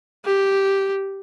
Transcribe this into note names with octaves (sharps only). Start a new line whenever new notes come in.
G4